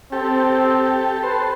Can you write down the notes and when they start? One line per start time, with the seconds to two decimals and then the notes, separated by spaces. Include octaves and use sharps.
0.12 C4 G4 A4
1.23 A4 B4 C5